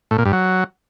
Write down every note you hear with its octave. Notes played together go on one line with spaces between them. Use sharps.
A2
A#2
G2
F#3